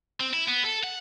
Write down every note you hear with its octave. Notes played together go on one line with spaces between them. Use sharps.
C4
E4
B3
A4
F#5